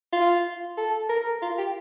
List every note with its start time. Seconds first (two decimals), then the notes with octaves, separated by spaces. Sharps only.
0.12 F4
0.77 A4
1.09 A#4
1.42 F4
1.58 G4